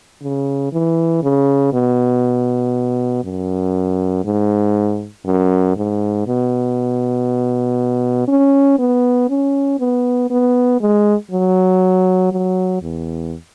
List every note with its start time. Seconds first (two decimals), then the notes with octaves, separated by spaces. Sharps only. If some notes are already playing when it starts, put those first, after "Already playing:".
0.22 C#3
0.72 E3
1.23 C#3
1.73 B2
3.24 F#2
4.25 G#2
5.25 F#2
5.76 G#2
6.27 B2
8.28 C#4
8.79 B3
9.30 C#4
9.79 B3
10.30 B3
10.81 G#3
11.31 F#3
12.32 F#3
12.82 E2